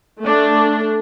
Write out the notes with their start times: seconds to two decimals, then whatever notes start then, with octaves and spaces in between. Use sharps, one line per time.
0.22 A3 D4 A4